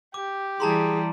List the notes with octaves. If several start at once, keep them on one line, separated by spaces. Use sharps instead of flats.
G4 D6
E3 G3 G#4 A5 A#5 C6